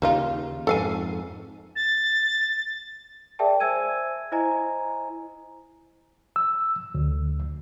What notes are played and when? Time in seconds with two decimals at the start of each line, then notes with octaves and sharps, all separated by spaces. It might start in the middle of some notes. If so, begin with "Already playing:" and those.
0.02 D#2 C#3 G3 D#4 F4
0.67 F2 G#2 A4 F5 G#5
1.75 A6
3.39 G#4 A#4 D5 E5 G5 A5
3.60 C5 E5 G#5 E6 G#6 D#7
4.32 E4 C5 D#5 G#5 A#5
6.36 E6
6.95 D2